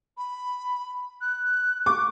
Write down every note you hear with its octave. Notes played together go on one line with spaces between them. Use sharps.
B5
F#6
C#6 D6